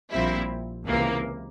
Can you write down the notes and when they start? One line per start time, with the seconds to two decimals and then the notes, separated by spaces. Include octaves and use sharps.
0.11 A#1 A#2 G3 C4 E4
0.86 C#2 C3 E3 A#3